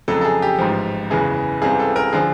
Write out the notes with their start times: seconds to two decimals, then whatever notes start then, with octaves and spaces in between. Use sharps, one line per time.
0.08 F2 C#3 F#3 A4
0.21 A4
0.24 G#4
0.42 G4
0.58 A1 G#2 F3
1.10 F#1 E2 C#3 E3 G#4
1.62 C#2 C3 E3 G3 G#4
1.79 A4
1.96 A#4
2.13 D3 F3 G#4